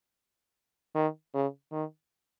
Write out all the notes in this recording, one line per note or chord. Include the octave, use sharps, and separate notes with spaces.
D#3
C#3
D#3